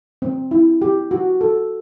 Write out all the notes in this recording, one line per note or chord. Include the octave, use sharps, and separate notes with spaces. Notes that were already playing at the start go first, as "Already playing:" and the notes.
C4
E4
G4
F#4
A4